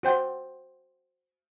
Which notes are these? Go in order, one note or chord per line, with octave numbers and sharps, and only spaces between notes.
F#4 C5 G5